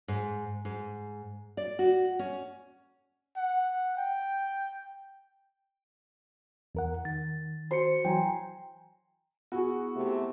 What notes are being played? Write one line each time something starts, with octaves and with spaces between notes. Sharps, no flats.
G#2
G#2
D5
F#4
C#4
F#5
G5
E2 A#4 F#5
D#3 A6
F#4 C5 C6 C#7
E3 F#3 G5 G#5 A#5
B3 E4 F#4 G#4 C#6
C3 A3 G4